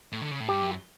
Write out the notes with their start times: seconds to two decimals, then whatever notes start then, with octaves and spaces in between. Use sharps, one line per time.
0.12 A2
0.21 D3
0.31 C#3
0.40 A2
0.48 G2 G4
0.61 F#2